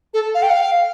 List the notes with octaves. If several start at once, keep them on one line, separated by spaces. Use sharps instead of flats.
A4
F5
G5
F5